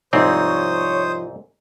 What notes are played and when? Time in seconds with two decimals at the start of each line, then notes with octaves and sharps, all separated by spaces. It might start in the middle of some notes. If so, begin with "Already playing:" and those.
0.13 C2 G#2 F3 C4 D#4 C5 C#5 D#6